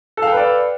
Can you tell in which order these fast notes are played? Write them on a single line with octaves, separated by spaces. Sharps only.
A4 F5 G5 B4 D5